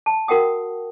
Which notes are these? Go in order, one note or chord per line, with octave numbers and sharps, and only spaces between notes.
A5
F#4 A#4 F#5 G5 D#6